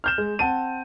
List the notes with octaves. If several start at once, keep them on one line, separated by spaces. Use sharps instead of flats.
F6 G6 E7
G#3
C4 F#5 A5 D#7